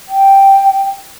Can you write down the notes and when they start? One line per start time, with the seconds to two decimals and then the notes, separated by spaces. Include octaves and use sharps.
0.08 G5